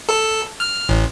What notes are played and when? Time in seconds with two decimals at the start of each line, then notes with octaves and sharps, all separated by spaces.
0.09 A4
0.60 F6
0.89 A1